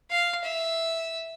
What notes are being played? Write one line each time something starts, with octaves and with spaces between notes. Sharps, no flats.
F5
E5